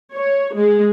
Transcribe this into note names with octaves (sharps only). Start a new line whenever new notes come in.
C#5
G#3